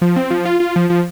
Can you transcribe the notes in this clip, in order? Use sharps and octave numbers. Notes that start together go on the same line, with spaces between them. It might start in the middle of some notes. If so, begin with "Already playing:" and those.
F3
C4
F3
F4
F4
F3
F3